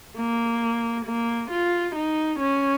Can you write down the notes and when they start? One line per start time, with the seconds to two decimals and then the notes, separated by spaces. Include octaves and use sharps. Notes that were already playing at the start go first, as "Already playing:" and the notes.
0.16 A#3
1.05 A#3
1.51 F4
1.95 D#4
2.40 C#4